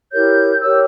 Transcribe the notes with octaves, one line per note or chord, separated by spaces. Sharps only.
E4 G4 A#4 C#5 G6
G4 A#4 C#5 E6